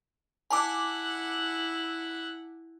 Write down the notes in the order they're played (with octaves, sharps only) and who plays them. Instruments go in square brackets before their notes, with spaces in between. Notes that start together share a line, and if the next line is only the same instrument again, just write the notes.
[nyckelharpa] E4 F#5 [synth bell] G#5 A5 D6